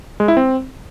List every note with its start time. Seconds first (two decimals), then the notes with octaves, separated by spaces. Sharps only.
0.20 G#3
0.28 E4
0.37 C4